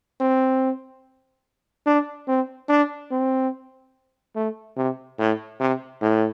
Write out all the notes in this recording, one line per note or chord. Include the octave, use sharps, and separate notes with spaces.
C4
D4
C4
D4
C4
A3
C3
A2
C3
A2